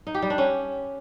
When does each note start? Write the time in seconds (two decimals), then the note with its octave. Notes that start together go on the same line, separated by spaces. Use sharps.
0.07 D#4
0.14 G4
0.22 G3
0.30 D4
0.38 C#4